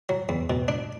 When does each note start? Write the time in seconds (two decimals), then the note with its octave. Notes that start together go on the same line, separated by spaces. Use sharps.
0.09 F#3
0.29 E2
0.50 B2
0.68 D4